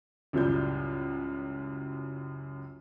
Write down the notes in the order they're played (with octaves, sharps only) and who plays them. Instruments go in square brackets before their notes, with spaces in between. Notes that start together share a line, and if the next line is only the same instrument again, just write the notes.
[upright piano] C#2 F#2 A2 F#3 G3 G6